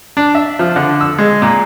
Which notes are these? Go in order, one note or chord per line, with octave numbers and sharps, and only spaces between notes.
D4
E5
F3
D3
E6
G#3
A#2